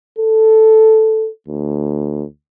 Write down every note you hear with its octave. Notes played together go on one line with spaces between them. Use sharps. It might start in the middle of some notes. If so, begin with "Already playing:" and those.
A4
D2